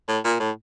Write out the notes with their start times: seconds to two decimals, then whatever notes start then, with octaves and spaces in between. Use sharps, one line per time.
0.08 A2
0.24 A#2
0.40 A2